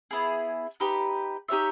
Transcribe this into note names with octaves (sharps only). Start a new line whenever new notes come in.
B3 E4 G#4
D#4 G4 B4
D#4 G4 C#5 E5